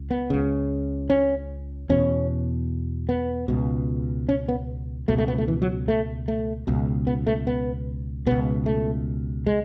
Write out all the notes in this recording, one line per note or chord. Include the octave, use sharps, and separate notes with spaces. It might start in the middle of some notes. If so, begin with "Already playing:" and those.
Already playing: C#2
B3
C#2 C#3
C#4
E2 B2 C#4
B3
C#2 B2
C#4
B3
C#2 B2 A3
A3
B3
A3
E3
F#3
A3
A3
C#2 B2
B3
A3
B3
C#2 B2 B3
A3
G#3